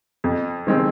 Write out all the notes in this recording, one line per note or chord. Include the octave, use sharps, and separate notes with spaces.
F2
D#3 G#3 C4